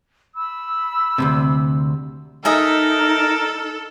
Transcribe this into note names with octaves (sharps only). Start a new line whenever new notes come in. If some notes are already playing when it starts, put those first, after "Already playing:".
B5 E6
D2 G2 C3
D#4 A4 A#4 D#5 E5 G#5